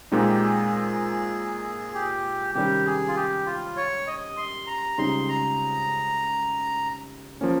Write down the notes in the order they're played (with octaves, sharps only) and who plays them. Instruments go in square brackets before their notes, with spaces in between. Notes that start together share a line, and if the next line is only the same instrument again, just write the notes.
[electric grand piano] A#2 G#3 C4 D#4 [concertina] G4
[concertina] G#4
G4
G#4
G4
[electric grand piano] C3 D#3 G3 C#4 [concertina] G4
[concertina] G#4
F4
G4
F4
C#5
D#5
C6
A#5
[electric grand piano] C#2 C#3 G3 C4 D#4 [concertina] C6
[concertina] A#5
[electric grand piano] F3 A#3 C#4